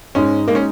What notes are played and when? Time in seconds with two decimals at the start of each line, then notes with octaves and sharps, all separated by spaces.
0.15 G#2 G#3 C#4 D#4
0.48 G#3 A#3 D#4
0.55 C#4